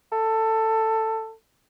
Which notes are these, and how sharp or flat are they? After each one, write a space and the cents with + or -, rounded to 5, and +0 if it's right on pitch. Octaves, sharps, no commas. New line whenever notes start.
A4 +15